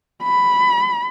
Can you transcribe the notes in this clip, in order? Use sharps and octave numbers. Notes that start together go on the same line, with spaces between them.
B5